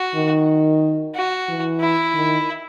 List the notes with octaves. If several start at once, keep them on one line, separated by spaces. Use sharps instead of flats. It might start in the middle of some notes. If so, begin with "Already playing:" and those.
Already playing: F#4
D#3
F#4
E3
E4
D#3